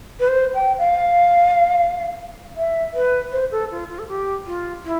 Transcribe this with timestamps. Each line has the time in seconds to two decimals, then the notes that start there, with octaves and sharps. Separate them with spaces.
0.19 B4
0.28 C5
0.54 G5
0.78 F5
2.56 E5
2.93 B4
3.32 C5
3.51 A4
3.71 F4
3.89 F4
3.98 A4
4.08 G4
4.46 F4
4.84 E4